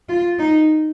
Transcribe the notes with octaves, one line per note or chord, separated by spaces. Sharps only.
F4
D#4